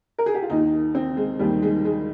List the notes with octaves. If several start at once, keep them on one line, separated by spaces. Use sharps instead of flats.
A#4
G#4
G4
F4
D#2 D#3 D#4
C4
G#3
D#2 D#3 G3
G#3
G#3